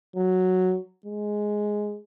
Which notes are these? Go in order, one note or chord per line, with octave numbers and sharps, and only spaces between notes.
F#3
G#3